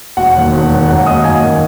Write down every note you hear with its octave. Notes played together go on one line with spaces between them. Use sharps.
E1 F#4 F#5
D#2 D#3
E1
D#2 D#3
F#2 F#4 F#5
D#3 A#3 D#5 D#6
F#2 G#5 G#6
D#3 A#3